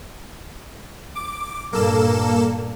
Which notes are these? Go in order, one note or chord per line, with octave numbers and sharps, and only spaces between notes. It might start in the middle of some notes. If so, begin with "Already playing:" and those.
D6
G2 A#2 A#3 A4 E7